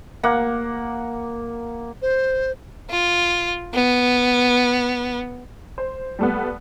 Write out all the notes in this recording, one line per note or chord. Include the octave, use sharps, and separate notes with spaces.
A#3 F#5
C5
F4
B3
C5
G3 A3 B3